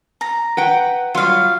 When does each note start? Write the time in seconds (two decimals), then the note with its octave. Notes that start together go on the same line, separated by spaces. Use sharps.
0.21 A#5
0.57 B4 F#5 G5
1.15 F#3 G3 F4 F5